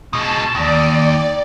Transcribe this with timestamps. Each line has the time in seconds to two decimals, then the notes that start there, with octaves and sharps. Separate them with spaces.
0.13 B2 G#3 A5
0.55 D#2 D5